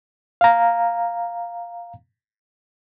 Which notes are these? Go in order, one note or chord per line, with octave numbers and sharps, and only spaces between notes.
F5 A#5